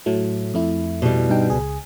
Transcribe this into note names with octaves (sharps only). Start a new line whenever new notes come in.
A2 F#3 A3
F2 A3 E4
B2 G3
G2 D#4 G5
C#2 G#4